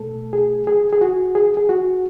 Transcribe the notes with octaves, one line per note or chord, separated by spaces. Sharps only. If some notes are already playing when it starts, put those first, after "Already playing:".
Already playing: B2 A3 A4
G#4
G#4
G#4
F#4
G#4
G#4
F#4